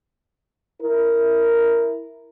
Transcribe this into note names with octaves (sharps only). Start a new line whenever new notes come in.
E4 A#4